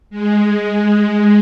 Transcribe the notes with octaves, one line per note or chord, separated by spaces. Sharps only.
G#3